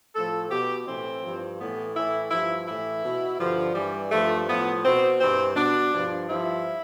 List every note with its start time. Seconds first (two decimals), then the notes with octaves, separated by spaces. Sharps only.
0.15 A2 F3 A4
0.51 B2 G4
0.87 A2 E3 C4
1.23 G2 F3
1.59 A2 E3 B3
1.95 A2 E3 E4
2.31 G2 F3 E4
2.67 A2 E3 E4
3.03 B2
3.39 G2 D3 F3
3.75 G2 E3 G3
4.11 G2 F3 A3
4.47 A2 F3 B3
4.84 B2 C4
5.19 G2 E3 C4
5.55 B2 D4
5.91 G2 F3
6.27 G2 F3 E4